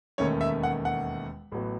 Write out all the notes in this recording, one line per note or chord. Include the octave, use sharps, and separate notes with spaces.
E1 D#2 D#3 A3 C#4 C#5
E5
F#5
F#5
A1 A2 F#3 B3